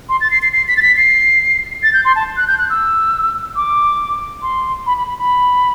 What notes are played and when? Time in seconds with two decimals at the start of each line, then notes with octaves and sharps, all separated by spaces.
0.09 C6
0.21 A6
0.31 C7
0.42 C7
0.53 C7
0.68 B6
0.77 A6
0.82 B6
0.97 C7
1.83 A6
1.93 G6
2.05 C6
2.15 A5
2.37 F#6
2.48 G6
2.58 F#6
2.70 E6
3.56 D6
4.42 C6
4.86 B5
4.97 B5
5.08 B5
5.19 B5